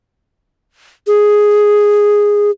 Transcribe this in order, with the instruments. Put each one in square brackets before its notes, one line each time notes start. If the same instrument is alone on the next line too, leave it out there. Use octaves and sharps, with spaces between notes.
[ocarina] G#4